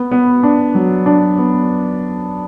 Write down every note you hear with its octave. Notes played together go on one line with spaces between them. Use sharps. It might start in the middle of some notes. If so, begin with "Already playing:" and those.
Already playing: B3
B3
D4
F#3
D4
B3